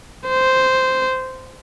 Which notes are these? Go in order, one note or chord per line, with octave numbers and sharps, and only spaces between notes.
C5